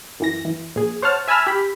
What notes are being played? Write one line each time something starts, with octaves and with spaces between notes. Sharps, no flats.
F#2 E3 A#6
E3
A#1 G#4
C5 C#5 F#5 A5 F6
E5 G#5 A5 B5 E6 F6
G4 B5